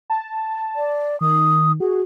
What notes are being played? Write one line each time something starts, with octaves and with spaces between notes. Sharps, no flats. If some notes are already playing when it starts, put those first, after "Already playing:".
A5
D5
D#3 D#6
F#4 G#4